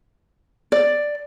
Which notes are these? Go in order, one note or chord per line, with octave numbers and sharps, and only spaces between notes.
D5